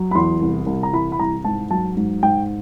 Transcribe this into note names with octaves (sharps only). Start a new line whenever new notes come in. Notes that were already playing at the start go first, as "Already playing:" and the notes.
Already playing: F#3
B5
E2 C6
C2
C2
A#5
E3 B5
B5
C2 A#5
G#2 A5
F#3 A5
G#2
G#2 G5